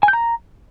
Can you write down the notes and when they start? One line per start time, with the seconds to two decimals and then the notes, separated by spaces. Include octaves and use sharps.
0.03 G#5
0.08 G6
0.13 A#5